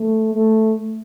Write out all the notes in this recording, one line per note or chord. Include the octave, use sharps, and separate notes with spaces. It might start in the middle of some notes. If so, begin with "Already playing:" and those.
Already playing: A3
A3